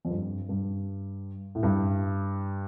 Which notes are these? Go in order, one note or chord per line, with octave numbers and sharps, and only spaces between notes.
F2
G2
G2
A2
G2